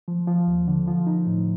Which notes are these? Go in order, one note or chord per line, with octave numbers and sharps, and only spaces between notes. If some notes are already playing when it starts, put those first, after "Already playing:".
F3
F3
D#2
D3
F3
D#4
A2